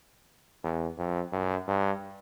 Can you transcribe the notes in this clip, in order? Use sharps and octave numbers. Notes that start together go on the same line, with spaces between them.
E2
F2
F#2
G2